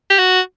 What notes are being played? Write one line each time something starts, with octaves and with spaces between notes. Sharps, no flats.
G4
F#4